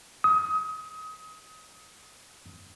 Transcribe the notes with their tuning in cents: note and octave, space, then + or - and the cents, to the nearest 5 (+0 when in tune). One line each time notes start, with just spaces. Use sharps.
D#6 +30